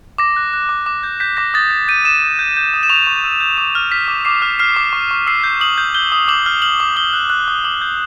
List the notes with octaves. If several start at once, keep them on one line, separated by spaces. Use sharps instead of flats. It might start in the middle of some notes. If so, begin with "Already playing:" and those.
D6 A#6
F#6
F#6
D6
D6
G6
G6 B6
D6 A#6
D#6 A6
G6
G6 D#7
D#6 E7
D#6
G6
G6
D#6
E7
C#6 F7
C#6
E6
G6
D6 E7
F6
F6 B6
D6
D6 C7
F6
F6 C7
D6
C#6
C#6
E6 C7
G6
D#6 F#7
G6
G6 G7
D#6
D6 F#7
F6
F6 F#7
D6
D#6 G7
F#6
F#6
D#6
D6 F#7
G6